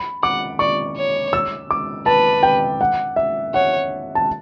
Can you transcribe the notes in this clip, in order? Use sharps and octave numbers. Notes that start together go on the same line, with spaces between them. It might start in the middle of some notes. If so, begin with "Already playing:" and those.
Already playing: B5
F#5 D6
D5 C#6
C#5
E6
D6
B4 A5
G5
F#5
E5
C#5 F#5
A5